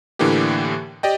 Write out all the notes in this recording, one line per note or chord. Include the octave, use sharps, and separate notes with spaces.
A2 D3 E3 A#3 D4 G4
G4 D5 D#5 G5